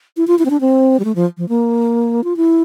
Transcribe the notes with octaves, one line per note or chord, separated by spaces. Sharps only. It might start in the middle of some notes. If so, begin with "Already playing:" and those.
E4
F4
E4
C4
D4
C4
G3
A3
F3
F3
A#3
F4
E4